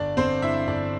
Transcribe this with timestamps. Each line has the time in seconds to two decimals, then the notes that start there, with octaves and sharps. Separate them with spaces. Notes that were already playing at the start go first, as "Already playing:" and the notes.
Already playing: G1 D4 D5
0.17 G1 C4 C5
0.42 G2 E4 E5
0.67 G1 D4 D5